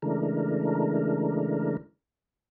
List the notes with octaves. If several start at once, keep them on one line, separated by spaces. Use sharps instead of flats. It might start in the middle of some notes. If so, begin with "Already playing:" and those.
C#3 E3 G#3 A3 D4 A#4